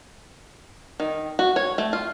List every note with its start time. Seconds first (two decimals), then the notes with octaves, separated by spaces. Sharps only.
1.00 D#3
1.39 F#4
1.56 C#5
1.78 A3
1.93 F4